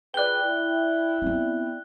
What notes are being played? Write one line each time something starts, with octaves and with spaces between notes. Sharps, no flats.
F4 G#4 B4 D5 G5 F#6 G7
E4
B3 C4